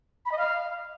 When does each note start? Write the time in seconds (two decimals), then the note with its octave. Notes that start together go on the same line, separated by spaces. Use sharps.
0.25 B5
0.31 D#5
0.38 F5